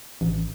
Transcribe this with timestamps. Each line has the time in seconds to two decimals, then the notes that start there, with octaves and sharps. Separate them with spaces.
0.21 A1